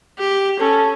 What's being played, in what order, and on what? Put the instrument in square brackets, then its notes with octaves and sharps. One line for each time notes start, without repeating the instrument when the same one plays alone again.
[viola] G4
[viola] C#4 [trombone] A4